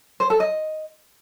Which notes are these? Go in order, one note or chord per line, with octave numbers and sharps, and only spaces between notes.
C5
A4
D#5